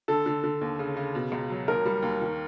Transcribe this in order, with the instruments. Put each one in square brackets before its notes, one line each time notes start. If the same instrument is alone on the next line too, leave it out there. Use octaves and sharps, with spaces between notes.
[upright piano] D3 [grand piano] A4
[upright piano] D3
D3
D#2
C#3
C#3
B2
C#2
F#3
[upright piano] D#2 [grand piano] A#4
[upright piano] G3
D#2
D#3